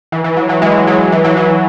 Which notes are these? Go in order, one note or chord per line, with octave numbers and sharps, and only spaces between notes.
E3
E3
F#3
F#3
E3 G#3
F#3
E3
F#3
E3